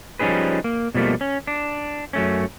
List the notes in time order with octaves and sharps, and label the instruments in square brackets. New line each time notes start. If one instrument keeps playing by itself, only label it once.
[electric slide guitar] F3 G3 C#4 D#4 G#4 B4
A#3
B2 F3 G3 A3 A#3
C#4
D4
F#2 A3 C#4